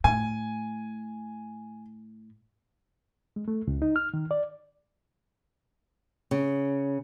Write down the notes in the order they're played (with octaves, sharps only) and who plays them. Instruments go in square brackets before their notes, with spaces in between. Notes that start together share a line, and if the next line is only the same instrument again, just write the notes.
[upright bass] A2 [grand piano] G#5
[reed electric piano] G#3
A3
C#2
D#4
F6
D#3
D5
[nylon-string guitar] C#3